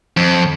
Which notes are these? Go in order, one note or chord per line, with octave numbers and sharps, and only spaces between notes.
F2